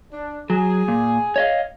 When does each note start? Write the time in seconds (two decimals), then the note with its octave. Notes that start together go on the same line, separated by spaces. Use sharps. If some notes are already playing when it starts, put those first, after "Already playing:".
0.12 D4
0.50 F#3 G#4
0.88 A#2
1.36 C#5 D#5 F5